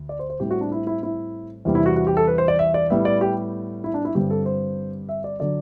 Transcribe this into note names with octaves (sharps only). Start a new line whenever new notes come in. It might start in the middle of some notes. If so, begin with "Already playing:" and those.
Already playing: D2
D5
C5
C5
A2 G3 C4 G4
F#4
D4
E4
E4
E4
E2 C3 E3 G3
E4
F#4
F#4
G4
A4
B4
C5
D5
E5
D5
A2 G3 B3 E5
D5
G4
E4
D4
E4
G2 D3 G3 C4 G4
A4
C5
E5
D5
D3 F#3 D5